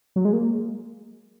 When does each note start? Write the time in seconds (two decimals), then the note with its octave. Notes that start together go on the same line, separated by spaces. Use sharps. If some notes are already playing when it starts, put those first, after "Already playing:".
0.16 F#3
0.25 G#3
0.33 A#3